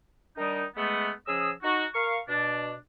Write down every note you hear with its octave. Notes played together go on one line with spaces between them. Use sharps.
D#3 G3 D4 D#4
G#3 A3 B3
C#3 F3 C#4 G#4 D#5 E6
D#4 F#4
A#4 F5 C#6
B2 D4